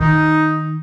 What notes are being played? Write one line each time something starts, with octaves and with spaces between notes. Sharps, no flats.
D#3 D#4